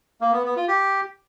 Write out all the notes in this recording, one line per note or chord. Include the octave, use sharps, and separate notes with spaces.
A#3
B3
B3
F4
G4